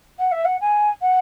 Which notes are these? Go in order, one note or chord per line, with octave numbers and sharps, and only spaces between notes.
F#5
E5
F#5
G#5
F#5